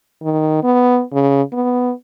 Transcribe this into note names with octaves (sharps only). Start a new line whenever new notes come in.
D#3
B3
C#3
B3